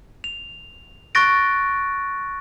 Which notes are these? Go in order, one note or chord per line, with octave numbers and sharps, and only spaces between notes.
F7
C#6 F#6 A6 A#6 D7